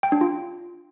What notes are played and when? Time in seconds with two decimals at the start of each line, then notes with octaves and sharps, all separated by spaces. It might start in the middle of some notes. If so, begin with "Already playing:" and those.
0.03 G5
0.12 D4
0.21 F4